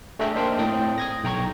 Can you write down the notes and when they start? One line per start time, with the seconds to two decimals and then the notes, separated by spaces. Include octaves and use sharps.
0.19 A3 D4 G#4 D#5 E5 G5
0.35 A#3 D4 D#4 C5 F5 G5
0.59 A2 C4 G5 D#6
0.98 D#6 G#6 A#6
1.24 B1 G5 A#5 C#6 G#6